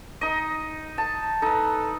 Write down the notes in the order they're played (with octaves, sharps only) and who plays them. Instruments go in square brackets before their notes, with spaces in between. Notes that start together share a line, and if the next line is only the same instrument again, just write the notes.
[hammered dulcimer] D#4 D#5
A5
[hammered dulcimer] D#4 B4 [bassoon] A4